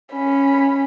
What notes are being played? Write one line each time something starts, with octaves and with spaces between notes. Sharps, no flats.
C#4 B5